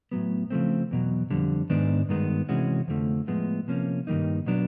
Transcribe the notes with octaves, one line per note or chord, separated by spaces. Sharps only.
A2 F#3 B3
C#3 F3 A3 C4
E2 B2 F#3
F2 D3 G3
G#2 D#3 G#3 B3 D4
G2 D#3 G#3 B3
C3 E3 G#3 C#4 F#4
F2 D3 F3 A3
A2 F3 G#3 B3
C3 F3 A#3 C#4
G2 D#3 G3 A#3 D#4
B2 F#3 B3 D4